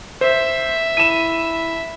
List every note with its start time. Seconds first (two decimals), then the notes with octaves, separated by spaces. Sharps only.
0.21 C5 E5
0.97 E4 A5 B5 D#7 E7